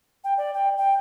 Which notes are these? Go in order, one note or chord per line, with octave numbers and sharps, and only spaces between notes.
G5
D5
G5
G5